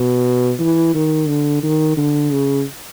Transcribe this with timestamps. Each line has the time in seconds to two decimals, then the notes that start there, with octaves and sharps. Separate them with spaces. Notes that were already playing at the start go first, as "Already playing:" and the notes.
Already playing: B2
0.59 E3
0.94 D#3
1.28 D3
1.63 D#3
1.97 D3
2.31 C#3